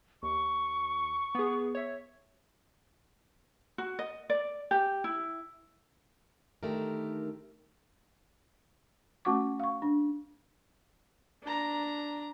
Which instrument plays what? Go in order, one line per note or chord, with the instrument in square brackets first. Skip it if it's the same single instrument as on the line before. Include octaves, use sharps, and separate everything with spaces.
[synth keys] D#2 [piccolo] C#6
[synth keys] B3 G#4
C#5 E5
[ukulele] F#4
D#5
D5
G4
E4
[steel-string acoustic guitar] D3 D#3 A3 D#4 G4 A#4
[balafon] A3 C#4 F#4 F#5 C#6 D6
F5 C#6
D4
[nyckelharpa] D4 A#5